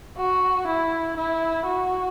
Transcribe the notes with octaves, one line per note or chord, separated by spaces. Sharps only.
F#4
E4
E4
F#4